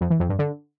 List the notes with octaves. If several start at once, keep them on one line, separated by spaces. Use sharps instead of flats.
F2
E3
F2
G2
D3